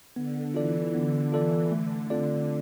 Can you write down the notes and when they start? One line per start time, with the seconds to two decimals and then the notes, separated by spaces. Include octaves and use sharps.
0.16 D3 B3
0.54 E3 F4 A4 D5
0.94 D3 B3
1.32 E3 F4 A4 D5
1.71 D3 A3
2.10 D3 C4 F4 A4 D5